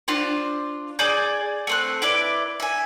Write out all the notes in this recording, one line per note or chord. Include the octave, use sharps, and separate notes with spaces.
D4 F4 C5
G#4 D5 G#5 G6
A3 C4 F#6
E4 B4 D5
E5 G#5